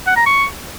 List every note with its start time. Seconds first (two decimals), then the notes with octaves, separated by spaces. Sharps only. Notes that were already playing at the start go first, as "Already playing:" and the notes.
0.07 F#5
0.16 A#5
0.26 C#6